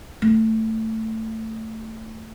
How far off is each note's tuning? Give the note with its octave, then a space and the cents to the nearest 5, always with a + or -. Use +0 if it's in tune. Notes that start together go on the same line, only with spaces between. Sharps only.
A3 +15